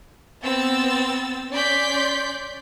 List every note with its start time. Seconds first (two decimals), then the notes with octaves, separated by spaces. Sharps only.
0.44 B3 C4 E6 A6
1.51 C#4 D5 C6 G6 B6